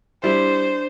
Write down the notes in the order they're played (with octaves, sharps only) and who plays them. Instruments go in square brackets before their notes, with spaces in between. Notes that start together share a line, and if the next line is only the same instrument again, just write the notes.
[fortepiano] G3 E4 [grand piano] D4 [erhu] C5